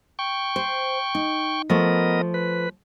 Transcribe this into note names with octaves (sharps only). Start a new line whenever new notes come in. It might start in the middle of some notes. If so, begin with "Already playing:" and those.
G5 C#6
C5
D#4
F3 A3 B3 A#4 D#5
B4